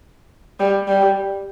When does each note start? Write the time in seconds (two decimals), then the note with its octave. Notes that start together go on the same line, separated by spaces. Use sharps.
0.60 G3
0.88 G3